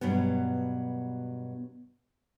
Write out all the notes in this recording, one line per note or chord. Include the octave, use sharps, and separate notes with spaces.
G2 B2 F#3 B3